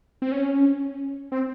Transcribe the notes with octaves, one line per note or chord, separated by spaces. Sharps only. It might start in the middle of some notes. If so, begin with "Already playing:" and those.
C4
C#4
C4